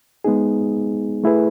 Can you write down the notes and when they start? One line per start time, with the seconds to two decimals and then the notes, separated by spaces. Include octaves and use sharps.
0.24 G#3 B3 D#4 G#4
1.24 A3 E4 G#4 B4